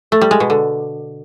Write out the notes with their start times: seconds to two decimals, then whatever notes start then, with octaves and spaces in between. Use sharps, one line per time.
0.12 A3
0.21 G3
0.31 G#3
0.40 B2
0.50 D3